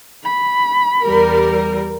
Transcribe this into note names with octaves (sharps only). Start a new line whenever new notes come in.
B5
E2 G3 A#4